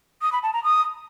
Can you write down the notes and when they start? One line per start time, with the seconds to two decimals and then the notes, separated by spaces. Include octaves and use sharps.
0.22 D#6
0.32 B5
0.43 A5
0.53 A#5
0.64 D#6